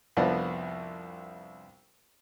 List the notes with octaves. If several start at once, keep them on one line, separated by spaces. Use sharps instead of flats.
C2 F2 F3 B3 D4